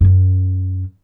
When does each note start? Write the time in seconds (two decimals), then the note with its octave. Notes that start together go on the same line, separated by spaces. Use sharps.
0.01 F#2 C#4